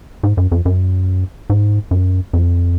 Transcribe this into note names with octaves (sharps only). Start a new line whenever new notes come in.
G#2
F#2
F2
F#2
G#2
F#2
F2